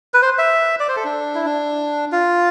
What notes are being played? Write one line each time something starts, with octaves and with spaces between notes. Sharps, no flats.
B4
C5
E5
D5
C5
A4
D4
E4
D4
F4